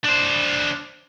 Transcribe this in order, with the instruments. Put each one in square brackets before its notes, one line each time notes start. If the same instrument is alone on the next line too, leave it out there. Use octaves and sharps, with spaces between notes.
[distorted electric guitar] D4 C5